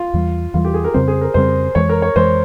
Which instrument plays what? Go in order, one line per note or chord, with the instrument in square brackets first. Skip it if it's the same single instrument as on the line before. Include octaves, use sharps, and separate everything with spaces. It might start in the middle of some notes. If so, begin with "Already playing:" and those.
Already playing: [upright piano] F4
[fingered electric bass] E2 E3 G3
[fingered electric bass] E2 E3 G3 [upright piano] F4
[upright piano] G4
G#4
A#4
[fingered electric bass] F2 C#3 G3 C4 [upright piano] C5
[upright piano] G#4
A#4
[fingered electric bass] F2 C#3 G3 C4 [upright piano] C5
[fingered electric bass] F2 E3 G#3 [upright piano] C#5
[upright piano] A#4
C#5
[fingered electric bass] F2 E3 G#3 [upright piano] C5